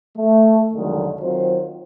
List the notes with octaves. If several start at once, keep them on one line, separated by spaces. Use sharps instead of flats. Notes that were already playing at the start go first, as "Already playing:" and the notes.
A3
C2 F2 D3 D#3 F#3 G#3
D#3 F#3 C4 F4 C5